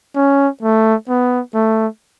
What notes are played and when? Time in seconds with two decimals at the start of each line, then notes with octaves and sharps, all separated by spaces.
0.16 C#4
0.63 A3
1.09 B3
1.55 A3